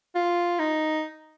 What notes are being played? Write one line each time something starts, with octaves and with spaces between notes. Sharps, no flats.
F4
D#4